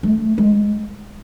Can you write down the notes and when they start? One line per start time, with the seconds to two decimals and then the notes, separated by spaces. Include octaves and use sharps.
0.03 A3
0.38 G#3